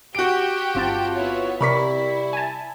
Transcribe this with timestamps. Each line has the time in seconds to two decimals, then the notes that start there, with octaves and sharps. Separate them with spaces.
0.15 F#4 G4 G5 D7
0.75 G1 C4 F4 A5
1.15 B3 E4 C#5
1.61 C3 G3 E4 A#4 B5 C#6 B6
2.33 G#5 A5